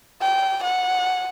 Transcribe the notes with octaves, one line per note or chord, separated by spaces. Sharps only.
G5
F#5